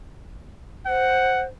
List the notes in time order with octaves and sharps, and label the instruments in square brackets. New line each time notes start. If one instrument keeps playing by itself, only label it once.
[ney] C5 [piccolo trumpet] F#5